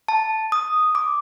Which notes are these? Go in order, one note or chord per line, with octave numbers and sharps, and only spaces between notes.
A5
D#6
D6